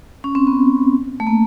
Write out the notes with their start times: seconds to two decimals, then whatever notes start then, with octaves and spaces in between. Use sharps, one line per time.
0.24 C#4
0.35 C4
0.47 B3
1.20 A3
1.27 A#3